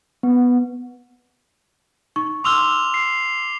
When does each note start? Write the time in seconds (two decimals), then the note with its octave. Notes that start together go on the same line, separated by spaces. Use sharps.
0.23 B3
2.16 D#4 C#6
2.44 C6 D6 E6 F6 F7 G7
2.94 C7